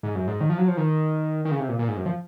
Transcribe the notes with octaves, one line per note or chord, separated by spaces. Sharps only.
G#2
F#2
G#2
D#3
F3
F#3
F3
D#3
D#3
C#3
C3
A#2
A#2
G#2
F#2
F3